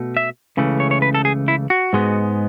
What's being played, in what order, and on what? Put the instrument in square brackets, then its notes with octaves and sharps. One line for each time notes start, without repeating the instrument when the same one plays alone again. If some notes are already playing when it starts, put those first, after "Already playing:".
Already playing: [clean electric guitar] B2 A3
E5
C#2 C#3 E3 A3
C#5
C#5
B4
A4
G#4
E4
F#4
G#2 G#3 B3